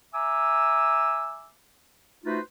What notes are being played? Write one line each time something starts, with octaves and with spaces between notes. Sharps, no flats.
E5 G#5 A#5 D6 E6
A3 D#4 F4 F#4 B4 C5